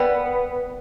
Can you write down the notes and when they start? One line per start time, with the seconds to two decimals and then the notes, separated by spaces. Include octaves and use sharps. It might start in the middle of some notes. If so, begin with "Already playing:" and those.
Already playing: B3 B4 D5 G5 B5